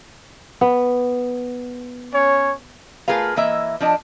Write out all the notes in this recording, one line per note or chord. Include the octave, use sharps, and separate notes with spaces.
B3
C#4 C#5
A3 F4 G#4 A#4 B4 F5
E3 A#3 D#5 E5
F3 D4 D#5